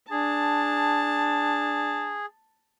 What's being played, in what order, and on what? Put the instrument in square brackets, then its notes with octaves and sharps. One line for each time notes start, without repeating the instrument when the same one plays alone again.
[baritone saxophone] D4 [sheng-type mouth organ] G#4 [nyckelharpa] A5